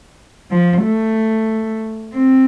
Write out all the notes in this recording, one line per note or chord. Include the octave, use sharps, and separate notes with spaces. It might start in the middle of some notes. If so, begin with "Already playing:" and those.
F3
A3
C4